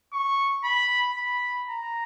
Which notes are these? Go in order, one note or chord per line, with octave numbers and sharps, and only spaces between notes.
C#6
B5
B5
A#5